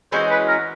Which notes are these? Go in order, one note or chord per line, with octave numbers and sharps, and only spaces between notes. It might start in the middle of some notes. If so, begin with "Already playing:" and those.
E3 G#3 C#4 F#4 C5
B4
A#4